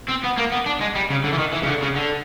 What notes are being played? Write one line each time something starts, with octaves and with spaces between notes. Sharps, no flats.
C4
B3
A#3
B3
D4
G#3
G3
C#3
D3
E3
D#3
E3
C#3
D3
C#3
D3